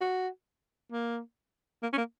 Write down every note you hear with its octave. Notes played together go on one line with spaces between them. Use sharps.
F#4
A#3
A#3
C#4
A#3